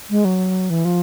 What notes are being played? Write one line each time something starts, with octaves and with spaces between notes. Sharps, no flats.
G#3
F#3
E3
F3